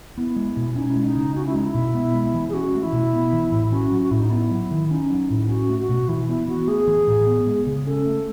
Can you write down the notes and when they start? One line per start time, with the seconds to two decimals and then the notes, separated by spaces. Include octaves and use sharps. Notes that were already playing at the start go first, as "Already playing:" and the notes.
0.17 B3 E4
0.36 G#3
0.57 B2
0.76 C#4 D#4
0.90 E4
0.96 G#3
1.03 D#4
1.16 C#3
1.35 C#4 F#4
1.46 E4
1.55 G#3 D#4
1.65 E4
1.75 B2
1.95 B3
2.14 G#3
2.34 E3
2.49 G#4
2.54 C#4 F#4
2.74 A3
2.83 E4
2.93 B2
3.13 B3
3.33 E3
3.52 A2
3.72 C#4 F#4
3.92 F#3
4.02 F#4
4.11 A2 E4
4.21 D#4
4.30 B3 E4
4.51 F#3
4.71 D#3
4.91 C#4 D#4
5.10 F#3 D#4
5.30 A2 E4
5.49 C#4 F#4
5.69 A3
5.79 F#4
5.89 B2
6.09 E3 E4
6.29 B3 E4
6.48 B3 F#4
6.67 A3 G#4
6.87 E3
7.07 A2
7.26 B3
7.47 G#3
7.67 C#3
7.86 C#4 A4
8.06 A3